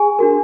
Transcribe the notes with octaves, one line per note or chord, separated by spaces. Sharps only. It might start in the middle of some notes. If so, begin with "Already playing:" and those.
Already playing: G#4 G#5
D4 F#4 A#4